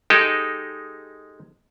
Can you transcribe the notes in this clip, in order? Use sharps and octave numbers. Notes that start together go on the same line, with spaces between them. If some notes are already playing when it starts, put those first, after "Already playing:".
G#3 D#4 G4 A4